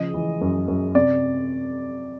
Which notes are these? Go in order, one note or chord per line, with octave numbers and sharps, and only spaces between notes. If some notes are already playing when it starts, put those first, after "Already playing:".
Already playing: C#3 F3 D#5
E3
F#2
F#2
C3 D5